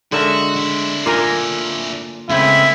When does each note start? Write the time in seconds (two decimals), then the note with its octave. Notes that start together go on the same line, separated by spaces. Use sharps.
0.12 D3 G#3 F#4 A#4 E5
0.56 D4 E4
1.06 A#3 F4 A#4 G#5 A#5
2.30 C#3 G#3 A3 B3 C4 E4